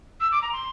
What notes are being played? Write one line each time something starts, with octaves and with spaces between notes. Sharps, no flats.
E6
D6
A#5
C6